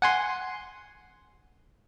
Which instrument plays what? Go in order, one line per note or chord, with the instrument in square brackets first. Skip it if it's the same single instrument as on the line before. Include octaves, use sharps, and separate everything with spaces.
[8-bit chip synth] F#5 G#5 C6